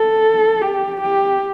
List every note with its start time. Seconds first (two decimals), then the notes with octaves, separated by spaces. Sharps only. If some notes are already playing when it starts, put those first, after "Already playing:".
Already playing: A4
0.62 G4
1.01 G4